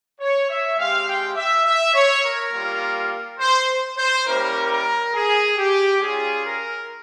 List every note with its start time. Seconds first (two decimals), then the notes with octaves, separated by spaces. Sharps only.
0.20 C#5
0.49 E5
0.78 G#3 C4 G4 F5
1.07 G5
1.36 E5
1.65 E5
1.94 C#5
2.24 A#4
2.53 G3 A#3 F4
3.39 C5
3.98 C5
4.26 G3 A#3 C#4 E4 G4 A#4
4.71 A#4
5.14 G#4
5.57 G4
6.01 G3 C#4 F4 G#4
6.44 A#4